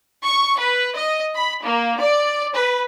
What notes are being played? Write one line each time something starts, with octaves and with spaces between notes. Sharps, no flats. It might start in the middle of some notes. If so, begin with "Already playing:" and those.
C#6
B4
D#5
B5
A#3
D5
B4